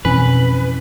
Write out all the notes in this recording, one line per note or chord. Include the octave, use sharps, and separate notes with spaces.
F2 B2 E3 C4 C#4 B4 G#5